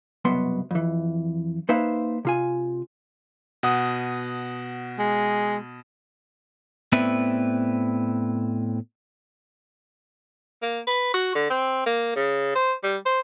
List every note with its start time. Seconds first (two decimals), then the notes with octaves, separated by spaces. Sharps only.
0.25 C2 F#2 B2 B3 C6
0.71 F2 E3
1.69 A#3 D#4 B4 C5 E5 F5
2.25 C3 F4 G#5
3.63 B2 F#5 D#6
4.99 G#3
6.92 A2 B3 C4 B4 D5 E5
10.62 A#3
10.87 B4
11.14 F#4
11.35 D3
11.50 C4
11.86 A#3
12.16 C#3
12.55 C5
12.84 G3
13.06 C5